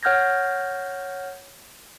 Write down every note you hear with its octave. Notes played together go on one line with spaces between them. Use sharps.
C#5 F#5 F6 G6 G#6 A#6